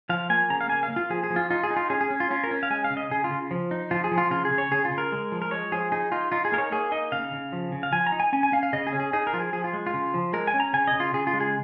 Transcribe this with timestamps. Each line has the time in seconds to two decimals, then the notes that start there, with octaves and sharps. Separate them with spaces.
0.09 F3 F5
0.30 A#3 G#5
0.50 C#3 A#5
0.61 F5
0.69 A#3 G#5
0.83 F5
0.90 A#3
0.96 F4
1.10 F3 G#4
1.24 G#4
1.30 F3
1.36 F4
1.50 D#4 F4
1.63 G#4
1.70 D#4
1.77 F4
1.90 C#4 G#4
2.01 G#4
2.10 C#4
2.20 F4
2.31 C#4 F4
2.44 A#4
2.51 C#4
2.63 F5
2.70 G#3 G#5
2.84 F5
2.90 C#3
2.97 D#5
3.11 C#3 G#4
3.24 F4
3.31 C#3
3.51 F3
3.71 D#4
3.91 F3 F4
4.04 G#4
4.11 F3
4.18 F4
4.30 C#3 F4
4.45 G#4
4.51 C#3
4.58 C#5
4.71 C#3 G#4
4.85 F4
4.91 C#3
4.98 A#4
5.12 G#3
5.32 F3
5.42 A#4
5.51 G#3 C#5
5.72 F3 G#4
5.92 D#4 G#4
6.12 D#4 F4
6.32 D#4 F4
6.45 G#4
6.52 A#3 A#4
6.58 C#5
6.72 A#3 G#4
6.92 D#4 D#5
7.12 C#3 F5
7.33 C#3
7.52 F3
7.72 C#3
7.83 F5
7.92 F3 G#5
8.07 A#5
8.12 D#4
8.20 G#5
8.33 C#4 G#5
8.43 G#5
8.52 C#4 F5
8.63 F5
8.73 C#3 D#5
8.87 G#4
8.92 C#4
9.00 G#4
9.13 D#4 G#4
9.27 A#4
9.33 F3 F4
9.40 G#4
9.53 F3 G#4
9.64 F4
9.73 G#3
9.86 F4
9.94 C#3
10.14 F3
10.33 G#3 A#4
10.47 G#5
10.54 C#4
10.60 A#5
10.73 C#3 G#5
10.87 D#5
10.93 C#3
11.00 F4
11.13 C#3 G#4
11.27 F4
11.33 G#3
11.40 G#4